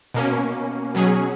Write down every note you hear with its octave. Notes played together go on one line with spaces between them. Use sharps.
B2 A#3 C#4
B2 F#3 C#4 G#4